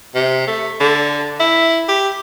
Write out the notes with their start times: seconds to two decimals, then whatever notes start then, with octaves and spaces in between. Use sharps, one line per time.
0.15 C3
0.47 A3
0.80 D3
1.40 E4
1.88 G4